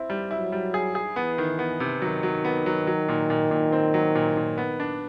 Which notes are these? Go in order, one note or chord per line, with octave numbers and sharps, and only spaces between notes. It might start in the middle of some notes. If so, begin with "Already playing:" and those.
Already playing: C4 E4
G3
F#3 E4
G3
G#4
G#4
E3 B3
D#3
B3
C3
D#3 F#3
F#3
B3
F#3
F#3
A#2
A#2
A#2
C4
F#3
A#2
A#2
B3
D4